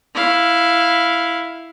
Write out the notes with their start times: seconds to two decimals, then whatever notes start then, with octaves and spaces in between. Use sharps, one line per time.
0.14 E4 F5